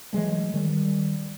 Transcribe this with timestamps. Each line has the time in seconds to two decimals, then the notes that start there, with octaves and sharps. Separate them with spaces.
0.13 E3 F#3 G#3 A3
0.54 D#3 G3